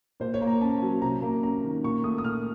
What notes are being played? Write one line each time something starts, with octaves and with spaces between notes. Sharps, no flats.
A#2 C5
C#5
A#3
A#5
C#4 A5
F#3
C3 A#5
A#3
C#4 A#5
D#3
A#2 C#6
A3 D#6
D#6
A#2 F6